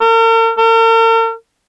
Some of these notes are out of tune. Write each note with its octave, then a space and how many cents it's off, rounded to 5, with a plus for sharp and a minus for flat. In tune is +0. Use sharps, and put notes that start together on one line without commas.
A#4 -45
A#4 -45